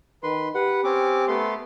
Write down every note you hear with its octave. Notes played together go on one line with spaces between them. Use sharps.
D#3 B4 C6
G4 B4 F#5
C4 C#4 D6
A3 B3 C6